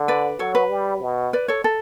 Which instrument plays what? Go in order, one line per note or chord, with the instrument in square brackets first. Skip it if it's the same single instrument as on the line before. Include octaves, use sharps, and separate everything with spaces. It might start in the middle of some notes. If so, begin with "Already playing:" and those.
Already playing: [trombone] D3
[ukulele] B4 D5
[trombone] F#3 [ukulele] A4 C#5
[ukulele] B4
[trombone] G3
B2
[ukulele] B4 D5
A4 C#5
A4